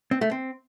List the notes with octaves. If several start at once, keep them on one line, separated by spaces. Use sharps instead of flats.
C4
A3
C4